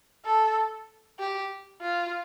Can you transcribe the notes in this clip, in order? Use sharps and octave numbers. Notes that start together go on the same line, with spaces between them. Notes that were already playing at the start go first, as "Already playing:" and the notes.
A4
G4
F4